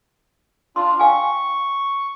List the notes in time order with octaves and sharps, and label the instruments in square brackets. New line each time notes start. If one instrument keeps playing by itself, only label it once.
[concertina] D4 F4 [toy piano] C6
[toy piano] F5 G5 G#5 [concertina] C#6